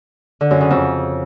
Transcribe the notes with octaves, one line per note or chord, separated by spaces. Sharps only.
D3
F#2
C#3
F2